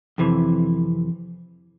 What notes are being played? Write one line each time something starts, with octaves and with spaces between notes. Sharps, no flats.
F2 C3 E3